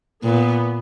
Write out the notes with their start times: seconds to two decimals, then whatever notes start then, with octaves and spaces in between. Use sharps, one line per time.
0.24 A#2 B3